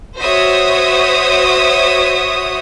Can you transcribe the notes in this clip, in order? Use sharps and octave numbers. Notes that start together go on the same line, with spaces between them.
F#4 C5 C#5 E5 D#6